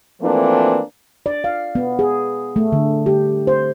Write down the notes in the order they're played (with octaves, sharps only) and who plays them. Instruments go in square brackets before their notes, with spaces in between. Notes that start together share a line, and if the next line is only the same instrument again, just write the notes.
[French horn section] E3 F3 A3 A#3 C4 D4
[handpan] D5
F5
B3
G#4
A3
D3
G4
C5